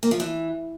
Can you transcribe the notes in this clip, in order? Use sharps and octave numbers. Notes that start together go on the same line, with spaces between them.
A#3
F3
E3